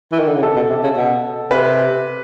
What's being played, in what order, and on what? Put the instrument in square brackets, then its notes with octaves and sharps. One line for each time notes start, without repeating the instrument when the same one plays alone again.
[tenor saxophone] E3
D#3
D3
C#3
[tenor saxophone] C3 [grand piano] A4
[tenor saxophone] B2
C3
C#3
B2
[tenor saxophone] C3 [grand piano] B4